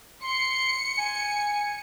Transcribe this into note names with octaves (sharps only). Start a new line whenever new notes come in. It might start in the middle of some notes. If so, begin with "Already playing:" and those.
C6 C#7
G#5